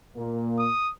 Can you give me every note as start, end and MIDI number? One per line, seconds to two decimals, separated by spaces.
0.16 0.68 46
0.16 0.68 58
0.59 0.91 87